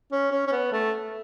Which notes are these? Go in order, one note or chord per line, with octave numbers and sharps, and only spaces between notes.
C#4
C#4
C#4
B3
A3